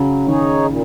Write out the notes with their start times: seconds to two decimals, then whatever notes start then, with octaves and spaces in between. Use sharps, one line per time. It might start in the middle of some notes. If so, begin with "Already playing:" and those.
Already playing: C#3 F#3
0.27 D#3 D#4 G#4 C#5
0.67 A#2